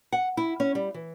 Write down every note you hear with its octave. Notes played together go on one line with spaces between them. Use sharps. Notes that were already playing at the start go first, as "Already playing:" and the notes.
F#5
E4
C#4
G3
E3